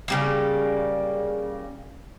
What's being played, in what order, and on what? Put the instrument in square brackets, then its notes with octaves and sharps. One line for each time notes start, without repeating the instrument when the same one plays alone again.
[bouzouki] C#3 G3 A#3